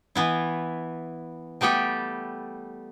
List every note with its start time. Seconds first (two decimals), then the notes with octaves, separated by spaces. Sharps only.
0.15 E3 B3 E4
1.61 G3 A3 B3 G4 A4